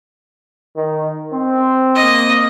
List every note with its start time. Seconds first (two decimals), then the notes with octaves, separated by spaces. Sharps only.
0.76 D#3
1.32 C4
1.95 A#3 D#5